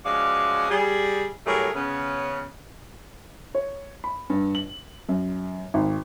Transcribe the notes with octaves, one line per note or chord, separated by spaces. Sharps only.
F3 G#3 C#4 F#4 D5 F5
G3 G#4
A2 F#3 G3 A3 G#4 A#4
C#3 B3 C#4
C#5
B5
G2
F#7
F#2
G#1